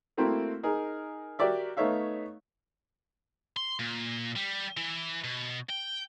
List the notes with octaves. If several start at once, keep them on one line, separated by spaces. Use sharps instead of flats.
A3 A#3 C4 E4 F#4
D#4 G#4 A#4
F#4 G4 A#4 D5 E5
A3 B3 D#4 C#5 E5 F5
C6
A#2
G3
E3
B2
G5